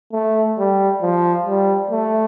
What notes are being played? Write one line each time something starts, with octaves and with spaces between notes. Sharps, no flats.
A3
G3
F3
G3
A3